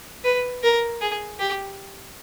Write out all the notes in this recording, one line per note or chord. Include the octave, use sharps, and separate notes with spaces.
B4
A#4
G#4
G4